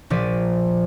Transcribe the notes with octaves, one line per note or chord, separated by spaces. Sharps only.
A#1 F3 D5 B6 D#7